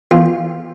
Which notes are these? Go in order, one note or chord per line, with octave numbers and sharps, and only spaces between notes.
E2 F4